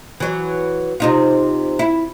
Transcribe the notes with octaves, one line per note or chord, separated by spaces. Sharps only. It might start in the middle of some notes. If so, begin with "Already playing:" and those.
E3 F#3
C3 D#4 F4
E4